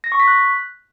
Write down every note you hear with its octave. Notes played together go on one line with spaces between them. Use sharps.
A#6
C#6
B6
F#6